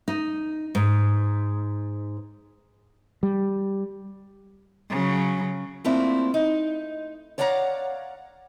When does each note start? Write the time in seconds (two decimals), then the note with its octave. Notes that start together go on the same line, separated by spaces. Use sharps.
0.08 D#4
0.75 G#2
3.23 G3
4.90 C#3 F#3
5.84 A3 A#3 C4 D4 E4 F4
6.34 D#4
7.38 C#5 D5 F5 F#5 G#5 A#5